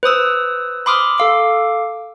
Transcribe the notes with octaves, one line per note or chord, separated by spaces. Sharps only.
B4 C5 D#6 E6
B5 C6 D6 D#6 F6
A4 F5 D6